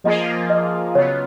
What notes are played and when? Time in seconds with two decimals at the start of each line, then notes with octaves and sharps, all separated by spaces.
0.04 F3 A#3 F4 G#4 D#5
0.50 D#5
0.94 C#3 F#3 B3 F4 C#5